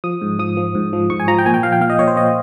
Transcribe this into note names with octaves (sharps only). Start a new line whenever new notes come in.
F3 D#6
G#2
F3 D#6
F3
G#2
F3
G#2 C#6
G#5
F3 A#5
G5
A#2 G#5
G5
F3 F5
G5
A#2 F5
D#5
A#2 C#5
C5
A#2 D#5